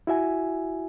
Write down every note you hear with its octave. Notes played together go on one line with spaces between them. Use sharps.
E4 F#4 E5 G#5